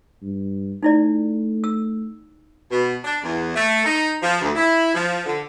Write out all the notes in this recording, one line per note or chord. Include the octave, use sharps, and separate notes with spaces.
G2
A3 D#4 E4 D5
E6
B2
D4
E2
A3
D#4
F3
D2
E4
F3
D3